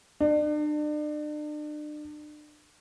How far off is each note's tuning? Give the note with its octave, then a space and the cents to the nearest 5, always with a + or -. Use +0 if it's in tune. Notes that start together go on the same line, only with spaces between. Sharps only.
D4 +40